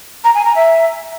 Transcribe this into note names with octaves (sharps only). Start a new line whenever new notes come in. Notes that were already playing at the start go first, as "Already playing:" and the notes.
A#5
G#5
A#5
E5